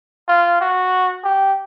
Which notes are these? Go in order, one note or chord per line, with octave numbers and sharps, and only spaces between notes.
F4
F#4
G4